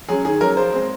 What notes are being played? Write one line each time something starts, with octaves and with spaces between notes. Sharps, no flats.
F#3 C#4 G#4
D#3 G#4
F#3 C#4 A#4
F3 C5
G#3 C4